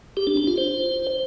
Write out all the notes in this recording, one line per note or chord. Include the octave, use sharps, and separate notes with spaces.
G4
D4
D4
F4
C5